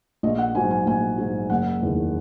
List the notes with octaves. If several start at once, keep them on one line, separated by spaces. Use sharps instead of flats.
A#1 D#5
F#5
G#2 F#3 G#5
G#5
A#1 G#5
G#2 F#3
F#1 F#5
E2 D#3